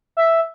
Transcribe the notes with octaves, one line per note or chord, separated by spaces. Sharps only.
E5